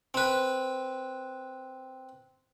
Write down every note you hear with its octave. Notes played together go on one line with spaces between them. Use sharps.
C4 B4